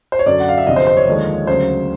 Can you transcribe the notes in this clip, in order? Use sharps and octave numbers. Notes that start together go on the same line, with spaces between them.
C5
C#5
F#2 D3 F#3 D5
F#5
F5
E5
G1 F2 C3 F3 D#5
C5
C5
C#5
D#2 D3 F3 G#3
D2 C#3 F#3 C5